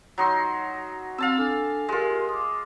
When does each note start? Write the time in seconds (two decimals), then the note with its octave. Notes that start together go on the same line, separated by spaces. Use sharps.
0.18 F#3 D#4 C6
1.18 C4 F5 A5 E6
1.38 D4 A4 G#5
1.89 G#3 F4 G4 A#4
2.29 D6 D#6